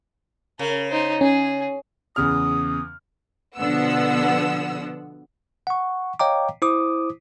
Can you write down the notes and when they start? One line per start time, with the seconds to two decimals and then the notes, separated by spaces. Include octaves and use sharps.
0.59 C#3 A#4
0.91 D#4 C5
1.21 C#4 G#4
2.16 E2 C#3 D#6 F6
3.57 B2 D3 F3 B3 F#5 E6
5.67 F#5 C#6
6.19 C#5 D#5 F5 G5 A#5 D6
6.62 E4 C5 D6 D#6